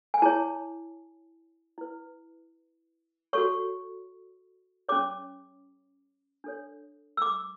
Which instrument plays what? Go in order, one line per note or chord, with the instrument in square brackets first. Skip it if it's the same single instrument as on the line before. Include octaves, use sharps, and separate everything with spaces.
[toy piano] G#5
E4 G#4 C#5 A5
E4 B4
F#4 A4 C#5 C#6
C#4 G#4 C#5 D6
D4 A4 C#5
E6
D6